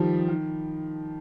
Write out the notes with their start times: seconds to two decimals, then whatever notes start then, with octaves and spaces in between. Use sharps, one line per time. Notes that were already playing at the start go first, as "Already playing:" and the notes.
Already playing: D#3 F3 G3
0.28 D#3